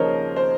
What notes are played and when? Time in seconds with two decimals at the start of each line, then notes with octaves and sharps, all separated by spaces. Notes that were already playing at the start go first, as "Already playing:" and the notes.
Already playing: D#2 C#3 F3 A#4 C5 C#5 D#5
0.36 C5